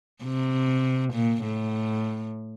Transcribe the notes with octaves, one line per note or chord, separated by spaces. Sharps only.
C3
A#2
A2